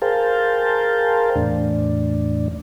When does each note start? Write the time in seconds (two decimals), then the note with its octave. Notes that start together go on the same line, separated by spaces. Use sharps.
0.02 G#4 A#4 C5 F5 G5 A5
1.36 E2 A2 D4